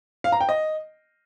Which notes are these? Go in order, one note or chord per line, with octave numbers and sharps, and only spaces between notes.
F5
A#5
G5
D#5